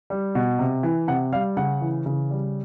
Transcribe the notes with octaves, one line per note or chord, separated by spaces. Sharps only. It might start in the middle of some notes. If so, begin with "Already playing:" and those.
G3
B2
C3
E3
C3 F#5
G3 F5
C#3 F#5
E3
C#3
G3